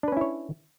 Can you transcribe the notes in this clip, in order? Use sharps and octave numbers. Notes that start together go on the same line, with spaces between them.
C#4 D4 E4 B4 C#5